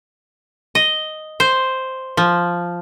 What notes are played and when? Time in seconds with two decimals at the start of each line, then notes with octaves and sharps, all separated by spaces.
0.75 D#5
1.40 C5
2.17 F3